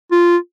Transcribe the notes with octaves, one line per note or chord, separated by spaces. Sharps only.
F4